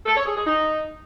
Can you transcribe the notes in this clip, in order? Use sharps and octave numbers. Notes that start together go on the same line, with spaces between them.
A4
C#5
G#4
G#4
D#4